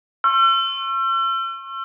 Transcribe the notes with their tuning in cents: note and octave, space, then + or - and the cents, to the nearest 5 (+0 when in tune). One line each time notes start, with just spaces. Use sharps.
C#6 -40 E6 +40